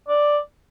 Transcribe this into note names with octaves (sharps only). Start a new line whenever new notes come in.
D5